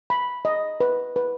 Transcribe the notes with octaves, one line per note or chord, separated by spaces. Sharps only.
B5
D#5
B4
B4